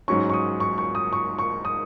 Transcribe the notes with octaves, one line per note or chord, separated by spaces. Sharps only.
G#2 F#3 C#4 C#6
C#6
D#6
C#6
C#6
D#6
C#6
C#6
D#6